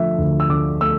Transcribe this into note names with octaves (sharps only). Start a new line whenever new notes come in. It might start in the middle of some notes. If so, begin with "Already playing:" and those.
Already playing: D3 F3 A3 E5
D2
E6
D3 D6
A3 E6